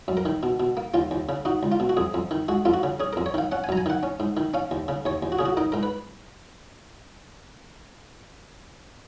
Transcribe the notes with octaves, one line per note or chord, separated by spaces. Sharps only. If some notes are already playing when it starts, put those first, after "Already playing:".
F#2
A#4
D#3
B2
B2
A#3
D#2 F4
D#2
C#3
D#4 F#4
C#2
F4
B2
F#4
F2 G#4
F2
D#3
G#3 F#4
F2 F4
F#4
C#3
C#4 G#4
F2 A#4
C#5
D#3 F5
C#4 F#5
G#5
F#2 A#5
G#5
D#3 F#5
C#4
G#2
D#3
C#4 F5
D#2
C#3
D#2 C#5
D#2
F#4
C#3 G#4
F#4
D#4 A#4
G#2 A#4
B4